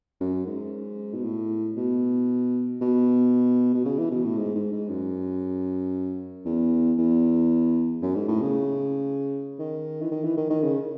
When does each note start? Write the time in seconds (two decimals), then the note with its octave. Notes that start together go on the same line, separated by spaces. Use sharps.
0.20 F#2
0.46 G#2
1.13 B2
1.24 A2
1.76 B2
2.81 B2
3.74 B2
3.85 C#3
3.98 E3
4.11 B2
4.24 A2
4.37 G#2
4.55 G#2
4.72 G#2
4.89 F#2
6.45 E2
6.98 E2
8.02 F#2
8.15 G#2
8.28 A2
8.42 C#3
9.59 D#3
10.02 E3
10.11 D#3
10.24 E3
10.37 D#3
10.50 D#3
10.63 C#3